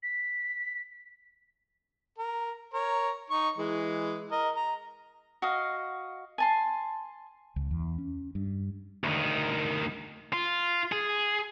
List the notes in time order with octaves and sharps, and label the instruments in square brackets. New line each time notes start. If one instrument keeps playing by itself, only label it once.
[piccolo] B6
[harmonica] A#4
A#4 C#5
D#4 C#6
E3 G#3
A#4 D#5
A#5
[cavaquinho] F#4 D#5 F5
G#5 A5 C6
[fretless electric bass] C#2
E2
C#4
G2
[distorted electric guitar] D2 D#3
F4
G#4